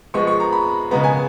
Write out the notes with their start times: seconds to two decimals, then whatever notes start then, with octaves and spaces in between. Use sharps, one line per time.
0.14 F3 G#3 B3 C#6
0.27 C#6
0.40 A#5
0.52 B5
0.91 C#3 G#3 B3 A#5
1.04 G#5